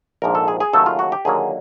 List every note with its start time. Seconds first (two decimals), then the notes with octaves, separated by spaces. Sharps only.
0.22 A#1 G#2 F3 A#4
0.35 A4
0.48 G#4
0.60 G#4
0.73 D#2 C#3 F#3 A3 A4
0.86 F4
0.99 F#4
1.12 G4
1.25 D#2 D3 F#3 A#3 G#4